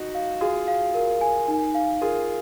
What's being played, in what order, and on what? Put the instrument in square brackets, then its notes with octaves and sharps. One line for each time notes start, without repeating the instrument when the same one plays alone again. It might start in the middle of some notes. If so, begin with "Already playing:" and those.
Already playing: [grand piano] D#4 F#4
[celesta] F5
[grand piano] F4 G#4 [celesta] F#4
[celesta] F5
A#4
G#5
D#4
F5
[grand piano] F4 G#4 [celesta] A#4